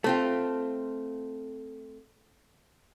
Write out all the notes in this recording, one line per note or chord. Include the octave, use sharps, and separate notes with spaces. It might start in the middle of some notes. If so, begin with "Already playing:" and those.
A3 C4 F4